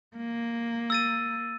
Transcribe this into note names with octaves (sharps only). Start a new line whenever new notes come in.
A#3
E6 A6 D#7